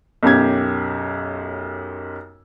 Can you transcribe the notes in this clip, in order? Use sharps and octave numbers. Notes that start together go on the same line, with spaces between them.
B1 F#2 G4 G#6